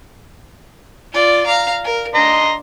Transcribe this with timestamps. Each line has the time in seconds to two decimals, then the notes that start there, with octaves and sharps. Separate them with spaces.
1.12 F4 D5
1.46 F5 A#5
1.84 A#4
2.15 D4 D#5 A#5 C6